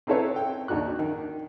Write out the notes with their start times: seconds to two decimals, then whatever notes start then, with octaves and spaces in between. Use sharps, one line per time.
0.07 C4 D#4 E4 A4 B4 C#5
0.36 G5
0.68 D#2 D4 D#4 F#4 F#6
0.99 D#3